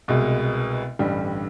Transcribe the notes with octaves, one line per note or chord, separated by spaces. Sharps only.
C2 B2 G#3 B3
A1 G2 D3 G3